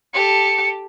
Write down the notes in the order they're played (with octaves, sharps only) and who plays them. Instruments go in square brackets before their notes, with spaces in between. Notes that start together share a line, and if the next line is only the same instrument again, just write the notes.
[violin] G4 A4 [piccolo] C#7